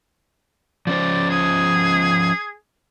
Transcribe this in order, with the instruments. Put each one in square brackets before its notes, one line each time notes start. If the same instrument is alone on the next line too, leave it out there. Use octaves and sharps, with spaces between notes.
[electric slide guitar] F3 C#4 C5 [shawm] D5
[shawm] G#4